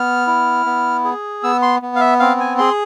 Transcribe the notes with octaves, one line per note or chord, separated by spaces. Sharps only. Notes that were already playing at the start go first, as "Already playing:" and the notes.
Already playing: B3 F6
E4
B3
G#4
B3 E6
C6
B3
F5
E5
C4 F5
G#5
G#4 C6